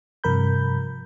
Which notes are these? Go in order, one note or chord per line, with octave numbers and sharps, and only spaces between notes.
G2 C3 F3 A#4 B5 G6